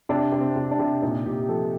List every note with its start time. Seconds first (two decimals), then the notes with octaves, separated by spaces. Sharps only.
0.09 C3 D4
0.32 C3
0.40 C4
0.56 C3
0.71 D4
0.79 C3
1.02 A#2 D#4
1.26 A#2 G4
1.49 F3 A4